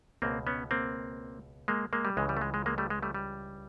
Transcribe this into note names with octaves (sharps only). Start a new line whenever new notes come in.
C#2 B2 A#3 C4
B3 C#4
A#3 C4
G#3 A#3
G#3 A#3
G3
C#2 C#3 E3 G#3
G3
A3
G#3
G#3
G#3 A#3
G3 A3
G#3
G3 A3
G3